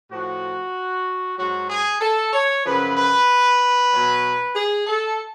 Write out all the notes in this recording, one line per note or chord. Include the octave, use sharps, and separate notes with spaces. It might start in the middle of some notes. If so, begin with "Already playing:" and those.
A2 F3 F#4
G#2 F#3 F#4
G#4
A4
C#5
F#2 C#3 F3 B4
B4
F#3
B2
G#4
A4